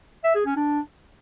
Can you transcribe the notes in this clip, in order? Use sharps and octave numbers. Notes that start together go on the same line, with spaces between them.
E5
G#4
C#4
D4